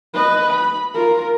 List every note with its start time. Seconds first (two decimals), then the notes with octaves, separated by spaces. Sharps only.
0.14 B4 D#5
0.52 B5
0.94 F4 A#4